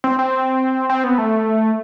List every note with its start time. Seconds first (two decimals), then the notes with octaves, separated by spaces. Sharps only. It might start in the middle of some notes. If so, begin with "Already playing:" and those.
0.04 C4
0.19 C4
0.90 C4
1.04 B3
1.18 A3